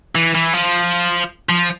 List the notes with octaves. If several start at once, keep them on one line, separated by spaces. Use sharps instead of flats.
E3
E3
F3
F3